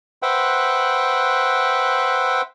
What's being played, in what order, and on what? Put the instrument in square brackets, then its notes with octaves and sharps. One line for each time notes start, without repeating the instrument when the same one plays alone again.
[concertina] B4 C5 E5 F#5 G5